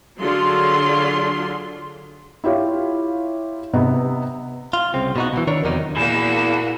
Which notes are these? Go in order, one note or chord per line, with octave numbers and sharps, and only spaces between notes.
D3 F#3 F4 G#4 C6
E4 F4 G4 C#5 F5
C3 B3 D#5 A#5
F4
C2 C#3 C4
B2 D#4 F#4
B2 E3
D#3 D4 A#4 C#5
E2 C3 D#3 F#3 D#4
A#2 E3 A#3 F#4 G#4 E7